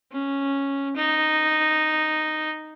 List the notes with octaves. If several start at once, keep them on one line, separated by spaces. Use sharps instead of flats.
C#4
D#4